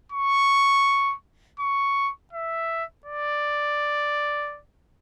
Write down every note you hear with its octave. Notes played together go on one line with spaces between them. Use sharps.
C#6
C#6
E5
D5